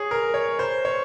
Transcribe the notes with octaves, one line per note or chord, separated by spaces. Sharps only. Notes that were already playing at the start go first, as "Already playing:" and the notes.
Already playing: G#4 C#5
A#4
C#5
C5
C#5